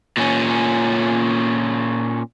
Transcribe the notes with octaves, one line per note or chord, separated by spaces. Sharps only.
A#2 C#4